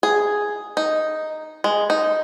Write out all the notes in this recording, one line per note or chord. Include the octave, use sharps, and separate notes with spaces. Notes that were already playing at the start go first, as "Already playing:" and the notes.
G#4
D#4
G#3
D#4